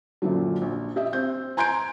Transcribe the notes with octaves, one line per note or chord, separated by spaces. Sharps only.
F#2 A#2 D3 F3 F#3
A#1
G4 D#5 E5
C4 G6
G#5 A#5 C6 G6 G#6 D7